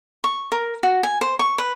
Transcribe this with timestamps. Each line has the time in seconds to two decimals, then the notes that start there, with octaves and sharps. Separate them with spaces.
0.24 C#6
0.52 A#4
0.83 F#4
1.03 G#5
1.21 C5
1.39 C#6
1.58 B4